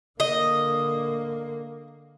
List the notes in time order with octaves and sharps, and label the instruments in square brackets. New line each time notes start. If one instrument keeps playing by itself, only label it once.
[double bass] D3 A#3 [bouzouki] D#5